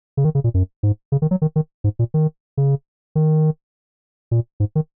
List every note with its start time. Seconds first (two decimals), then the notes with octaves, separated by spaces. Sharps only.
0.17 C#3
0.25 D#3
0.35 C#3
0.44 A#2
0.54 F#2
0.83 G#2
1.12 C#3
1.22 D#3
1.31 F#3
1.42 D#3
1.56 D#3
1.84 G#2
1.99 A#2
2.14 D#3
2.57 C#3
3.15 D#3
4.31 A#2
4.60 G#2
4.75 D#3